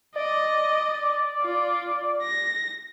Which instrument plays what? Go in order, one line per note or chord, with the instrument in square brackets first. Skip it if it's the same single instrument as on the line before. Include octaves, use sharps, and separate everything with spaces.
[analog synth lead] D5 [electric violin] D#5
[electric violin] F4
A#6